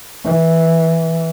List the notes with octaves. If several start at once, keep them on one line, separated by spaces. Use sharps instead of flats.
E3